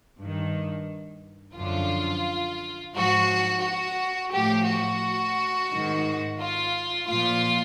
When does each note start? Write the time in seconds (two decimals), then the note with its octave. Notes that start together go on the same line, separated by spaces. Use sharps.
0.18 G2 D#3
1.55 F#2 D3 F3 F4
2.94 G#2 F3 F#4
3.63 F#4
4.32 A2 F3 G4
4.66 F#4
5.70 G#2 D#3
6.39 F4
7.07 A#2 F3 F4